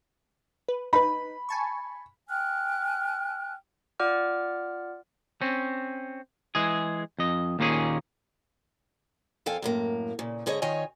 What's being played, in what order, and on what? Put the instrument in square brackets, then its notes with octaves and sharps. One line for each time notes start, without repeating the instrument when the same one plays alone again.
[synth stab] B4
[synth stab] D#4 B4 [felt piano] B5
[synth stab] G#5 A5 C#6
[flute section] G5 G#5 F6 F#6
[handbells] F4 D5 F#5 D6 F6
[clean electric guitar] C4 C#4
E3 G#3 G#4
F2 D#5
D#2 A#2 A#3 C#4 G#4
[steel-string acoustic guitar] F2 A4 F5 G5 G#5
F#2 A2 A#3
A#2 C#3
G#2 D3 G#4 C#5 D#5
D#3 F4 C#5 D#5 G#5